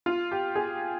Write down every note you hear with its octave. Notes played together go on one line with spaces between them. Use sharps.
F4
G4
G#4